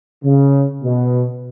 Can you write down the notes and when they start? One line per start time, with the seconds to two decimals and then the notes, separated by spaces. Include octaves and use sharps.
0.24 C#3
0.84 B2